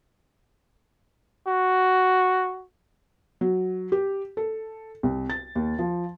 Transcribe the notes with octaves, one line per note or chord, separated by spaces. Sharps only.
F#4
F#3
G4
A4
C2
A6
D#2
F3